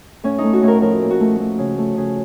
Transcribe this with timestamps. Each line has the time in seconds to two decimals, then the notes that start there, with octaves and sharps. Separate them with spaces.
0.24 A2 C#4
0.38 D#4
0.44 A3
0.53 F#4
0.62 A2
0.68 A#4
0.81 F3 A#4
1.01 A#2
1.10 F#4
1.20 A3
1.40 A3
1.58 C#3
1.78 A3
1.97 C#3